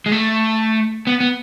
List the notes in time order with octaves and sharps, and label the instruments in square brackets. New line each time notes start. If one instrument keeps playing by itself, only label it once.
[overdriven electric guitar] G#3
A3
B3
B3